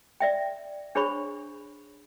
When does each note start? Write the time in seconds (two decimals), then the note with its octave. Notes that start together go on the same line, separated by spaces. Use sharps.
0.20 D5 E5 G5
0.95 D4 G#4 C5 C#5 B5 C#6